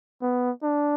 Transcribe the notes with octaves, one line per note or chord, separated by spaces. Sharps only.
B3
D4